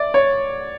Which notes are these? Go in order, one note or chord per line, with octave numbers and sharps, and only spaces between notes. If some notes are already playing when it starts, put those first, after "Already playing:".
Already playing: D5 E5
C#5